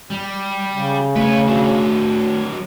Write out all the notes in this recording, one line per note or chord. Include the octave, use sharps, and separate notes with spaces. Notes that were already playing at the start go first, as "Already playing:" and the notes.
G3
C#3
A3 B4 C#5
F#3 D4